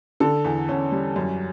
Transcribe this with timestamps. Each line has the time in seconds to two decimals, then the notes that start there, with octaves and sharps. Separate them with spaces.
0.20 D3 A4
0.44 E2
0.68 E2 C#4
0.92 G3
1.16 F#2